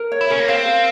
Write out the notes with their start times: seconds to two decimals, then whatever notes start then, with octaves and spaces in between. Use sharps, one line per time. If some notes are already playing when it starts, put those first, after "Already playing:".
Already playing: A#4
0.12 C#5
0.21 E4
0.30 C#4 A#4
0.40 A#3
0.48 C4 F5
0.65 A#4